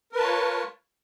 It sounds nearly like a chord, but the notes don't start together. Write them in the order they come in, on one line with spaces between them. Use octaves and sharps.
A#4 B4 A5 F4 C#5